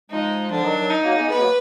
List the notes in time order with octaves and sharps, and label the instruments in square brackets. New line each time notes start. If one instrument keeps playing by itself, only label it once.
[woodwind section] F3 G#3 [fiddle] D#4
[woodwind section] D3 F3 [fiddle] D4
[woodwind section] D#3 F#3
D#3 F#3
[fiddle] D#4
[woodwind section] F#3 A#3
G#3 B3
[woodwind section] G#3 B3 [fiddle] B4
[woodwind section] F#3 A#3